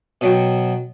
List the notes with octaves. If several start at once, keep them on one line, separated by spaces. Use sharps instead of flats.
B2 F#3 G5